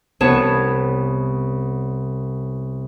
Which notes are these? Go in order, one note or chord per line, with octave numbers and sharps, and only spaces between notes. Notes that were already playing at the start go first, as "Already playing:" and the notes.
C2 B3 C#5 A5 E7